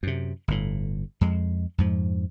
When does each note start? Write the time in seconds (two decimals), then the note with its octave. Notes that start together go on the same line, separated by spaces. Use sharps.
0.03 F#2 C3
0.48 G1 A2
1.21 F2 G#3
1.78 F2 G#2 F3